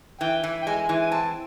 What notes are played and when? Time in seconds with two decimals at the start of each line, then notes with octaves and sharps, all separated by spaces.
0.21 E3 G5
0.44 E3
0.63 G5
0.67 G#3 G#5
0.89 E3
1.01 G#5
1.12 C4 A5